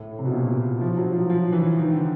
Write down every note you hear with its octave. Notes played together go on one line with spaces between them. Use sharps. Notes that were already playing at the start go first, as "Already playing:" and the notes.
Already playing: A2
C3
B2
A#2
F3
F#3
F3
F3
E3
D#3
D3